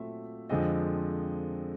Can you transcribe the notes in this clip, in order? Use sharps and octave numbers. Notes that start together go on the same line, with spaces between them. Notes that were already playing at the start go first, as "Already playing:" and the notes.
Already playing: A#2 F#3 A3 C4 E5
F2 D3 F3 G#3 C4 D#5